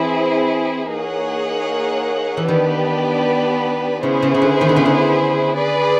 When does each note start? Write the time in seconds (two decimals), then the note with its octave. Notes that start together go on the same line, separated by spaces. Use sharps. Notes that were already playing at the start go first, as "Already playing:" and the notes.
Already playing: E3 C4 E4 G#4
0.93 A#3 D#4 G#4 C#5 F#5
2.37 E3
2.48 D#3 B3 D4 G4 B4 D5
4.03 C#3 B3 E4 G#4 C5
4.22 C#3
4.34 C#3
4.42 D3
4.61 D#3
4.69 D3
4.76 C#3
4.85 D3
5.58 G#4 B4 D5